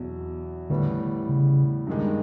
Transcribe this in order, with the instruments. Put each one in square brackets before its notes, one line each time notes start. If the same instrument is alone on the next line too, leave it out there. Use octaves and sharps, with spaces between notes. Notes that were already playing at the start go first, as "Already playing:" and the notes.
Already playing: [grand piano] E2 B2 F#3
[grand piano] A2 E3 G3 B3 [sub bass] D3
[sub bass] C#3
[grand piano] G2 D#3 G#3